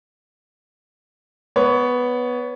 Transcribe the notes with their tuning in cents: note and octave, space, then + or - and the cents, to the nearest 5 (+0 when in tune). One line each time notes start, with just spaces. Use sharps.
B3 +0 C#5 +20